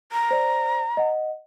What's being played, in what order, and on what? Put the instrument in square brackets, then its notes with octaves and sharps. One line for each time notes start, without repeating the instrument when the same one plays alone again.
[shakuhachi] A#5
[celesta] C5 D5
D#5 F#5